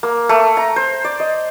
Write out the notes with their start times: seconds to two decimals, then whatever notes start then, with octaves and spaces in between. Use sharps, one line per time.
0.03 A#3
0.29 A3
0.57 A#5
0.76 C5
1.05 D5
1.20 D#5